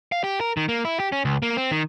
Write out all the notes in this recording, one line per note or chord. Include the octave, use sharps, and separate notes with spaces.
F5
G4
A#4
D#3
A#3
E4
G4
C#4
C#2
A#3
C4
D#3